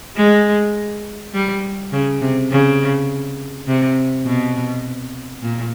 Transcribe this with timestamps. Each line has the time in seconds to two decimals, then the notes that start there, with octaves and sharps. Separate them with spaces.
0.17 G#3
1.34 G3
1.93 C#3
2.21 C3
2.51 C#3
3.68 C3
4.25 B2
5.43 A#2